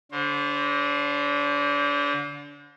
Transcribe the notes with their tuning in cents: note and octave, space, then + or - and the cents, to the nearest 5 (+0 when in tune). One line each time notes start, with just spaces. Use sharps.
D3 -30 C5 +25